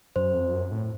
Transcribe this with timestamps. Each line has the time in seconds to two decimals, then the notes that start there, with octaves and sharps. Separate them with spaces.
0.16 F#2 C5
0.35 F2
0.53 F#2
0.72 A2